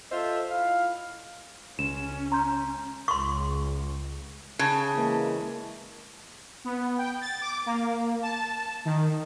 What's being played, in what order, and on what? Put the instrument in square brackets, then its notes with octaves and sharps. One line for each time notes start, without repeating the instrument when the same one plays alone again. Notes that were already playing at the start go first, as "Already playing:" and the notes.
[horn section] F4 A4 C5 D#5 E5
E4 F4 F5
[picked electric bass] C#2 [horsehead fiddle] C#4 [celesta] E7
[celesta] A#5 C6 G6
[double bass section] C#2 [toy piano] C6 C#6
[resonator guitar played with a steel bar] C#3 [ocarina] A5
[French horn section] E3 G#3 A#3
[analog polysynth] B3
G5
A6
D6
A#3
A5
D#3